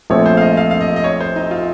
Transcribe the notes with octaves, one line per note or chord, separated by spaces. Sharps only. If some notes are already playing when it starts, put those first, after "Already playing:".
A#1 A#2 A3 C4 C#5
C5
F5
D#5
F5
F5
D#5
D#5
C#5
C5
D#4
F4